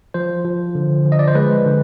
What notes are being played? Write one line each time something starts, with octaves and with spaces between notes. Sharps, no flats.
F3 C5
F3
D3
F3
D#5
D5
C5
G#3 B4
D3